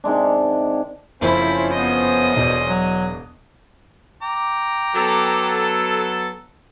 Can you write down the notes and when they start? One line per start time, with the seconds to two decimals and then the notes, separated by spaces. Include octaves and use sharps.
0.04 C3 D#3 G#3 D4
1.21 F#1 F2 F3 C#4 E4 C5 B5
1.73 B3 D#5 D#6
2.37 E1 B2 D5
2.67 F#3
4.22 G5 A#5 D6
4.95 F#3 B3 A4